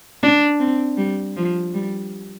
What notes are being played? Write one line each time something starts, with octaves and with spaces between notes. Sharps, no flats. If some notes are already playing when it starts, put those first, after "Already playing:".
D4
C4
G3
F3
G3